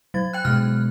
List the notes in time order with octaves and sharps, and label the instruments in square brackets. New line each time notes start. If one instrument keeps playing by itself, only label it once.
[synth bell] F#3 A6
G5 F#6
[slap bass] B2 G#3 [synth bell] F6